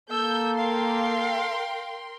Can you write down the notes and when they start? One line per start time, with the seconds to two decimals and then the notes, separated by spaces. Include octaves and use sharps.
0.10 A#3 A4 E6 G6
0.58 A#4 F5 G5 C6